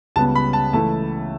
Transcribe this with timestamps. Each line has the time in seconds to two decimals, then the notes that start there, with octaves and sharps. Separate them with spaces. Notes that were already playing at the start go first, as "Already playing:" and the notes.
0.16 C#2 C#3 G3 B3 A5
0.35 B5
0.53 A5
0.73 C#2 C#3 E3 A3 E4 A5